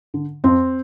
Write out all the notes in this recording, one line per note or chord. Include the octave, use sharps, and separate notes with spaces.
D3
F2 C4